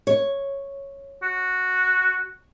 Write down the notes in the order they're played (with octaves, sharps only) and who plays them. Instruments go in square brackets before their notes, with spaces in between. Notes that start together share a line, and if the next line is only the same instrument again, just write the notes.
[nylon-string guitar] C#5
[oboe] F#4